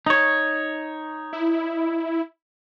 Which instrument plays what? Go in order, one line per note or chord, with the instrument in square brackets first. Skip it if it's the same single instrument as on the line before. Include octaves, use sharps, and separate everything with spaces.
[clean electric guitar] D#4 C#5
[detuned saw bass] E4